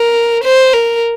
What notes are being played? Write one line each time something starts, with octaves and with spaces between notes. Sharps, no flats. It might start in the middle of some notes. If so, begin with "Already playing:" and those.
Already playing: A#4
C5
A#4